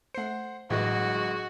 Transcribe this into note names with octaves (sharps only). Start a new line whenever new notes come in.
A3 C5 F#5 C7
G1 A2 E3 F#3 G#3 F#4 A#6